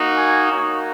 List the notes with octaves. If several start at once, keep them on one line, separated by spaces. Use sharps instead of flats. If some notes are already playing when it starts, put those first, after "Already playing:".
Already playing: A#3 D#4 F#4
G#5
A#3 D#4 F#4 C#5